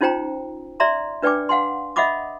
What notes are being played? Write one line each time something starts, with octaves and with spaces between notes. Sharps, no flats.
C#4 D#4 F4 C5 G5 A#5
D5 E5 A#5 C6
D4 B4 D5 G5 G#5 D6
F5 F#5 G#5 C6
D#5 E5 F#5 B5 D6 D#6